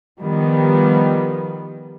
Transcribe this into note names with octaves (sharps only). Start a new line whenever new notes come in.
D#3 F3 G3 B3